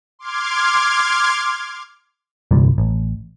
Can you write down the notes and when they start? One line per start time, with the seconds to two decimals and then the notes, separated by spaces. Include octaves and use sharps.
0.19 C6 D6 F6 G#6
2.51 G1 C2 A#2
2.78 A1